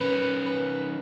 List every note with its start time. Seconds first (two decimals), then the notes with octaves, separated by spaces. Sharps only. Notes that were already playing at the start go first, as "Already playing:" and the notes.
0.01 D#3 C#4 B4
0.46 B4